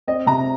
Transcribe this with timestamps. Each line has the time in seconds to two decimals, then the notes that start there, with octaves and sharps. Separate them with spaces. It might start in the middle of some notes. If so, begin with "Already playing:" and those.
0.07 C4 D#5
0.26 C3 A#5